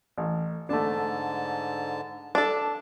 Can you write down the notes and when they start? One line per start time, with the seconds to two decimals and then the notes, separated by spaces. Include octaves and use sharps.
0.17 A1
0.69 G#2 D3 A3 D4 A5
2.35 D4 A4